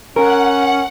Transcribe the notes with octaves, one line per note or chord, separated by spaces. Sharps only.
C#4 A#4 F#5